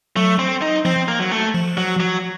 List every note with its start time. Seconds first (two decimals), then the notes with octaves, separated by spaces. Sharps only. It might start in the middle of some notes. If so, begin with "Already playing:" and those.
0.16 F#3 A3
0.39 C4
0.62 D#4
0.85 F3 C4
1.08 A#3
1.20 F#3
1.32 A3
1.54 F3
1.77 F#3
2.00 F#3